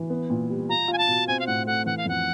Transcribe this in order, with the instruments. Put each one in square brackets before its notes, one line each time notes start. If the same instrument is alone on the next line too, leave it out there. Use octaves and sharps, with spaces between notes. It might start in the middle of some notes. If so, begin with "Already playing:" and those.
Already playing: [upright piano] E3
B3
A#2
G3
[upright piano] F4 [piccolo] A#5
[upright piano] F4 [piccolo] G#5
[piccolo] A5
[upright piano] B2
[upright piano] C4 [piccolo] G#5
[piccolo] F5
[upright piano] A2 [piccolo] F#5
[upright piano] A3 [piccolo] F#5
[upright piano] E3 [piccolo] F#5
[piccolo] F5
[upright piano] F2 [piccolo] F#5